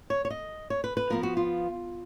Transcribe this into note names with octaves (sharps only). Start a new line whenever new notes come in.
C#5
C#5
D#5
C#5
B4
B4
F3 B3 F4 A#4
F#4
F4